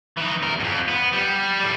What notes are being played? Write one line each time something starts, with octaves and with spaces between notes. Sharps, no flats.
E3 D#4
E2 A#4
F2 G#2
B3
G3
A2 G3